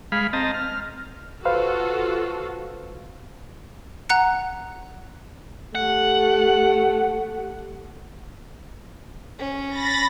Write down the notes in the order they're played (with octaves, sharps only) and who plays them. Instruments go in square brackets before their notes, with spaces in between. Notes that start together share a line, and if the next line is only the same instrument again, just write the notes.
[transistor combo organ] G#3 F5 B5
C4 D#5 A5 A#5
F6
[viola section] F4 F#4 A4 [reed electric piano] B4 C5 F5
[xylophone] F#5 A#5 F#6 C#7
[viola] A3 G4 [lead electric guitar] F#5
[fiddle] C#4
[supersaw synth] B5 A6 A#6